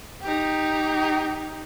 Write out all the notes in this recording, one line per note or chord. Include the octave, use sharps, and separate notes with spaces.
D#4 G4